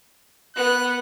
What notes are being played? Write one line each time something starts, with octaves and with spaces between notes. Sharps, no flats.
B3 F#6